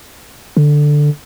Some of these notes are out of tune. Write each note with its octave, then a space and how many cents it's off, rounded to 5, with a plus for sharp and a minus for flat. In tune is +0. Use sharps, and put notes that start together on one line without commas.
D3 +5